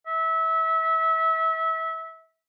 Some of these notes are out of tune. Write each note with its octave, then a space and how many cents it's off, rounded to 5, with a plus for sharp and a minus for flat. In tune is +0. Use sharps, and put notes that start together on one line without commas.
E5 -25